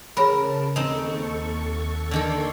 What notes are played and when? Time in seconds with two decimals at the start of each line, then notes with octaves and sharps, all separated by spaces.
0.17 C#3 G#4 A#4 C#5 A5 B5
0.76 D#2 C4 D#4 A4 C#6
2.11 D3 D#3 A4 D5 C6 C#6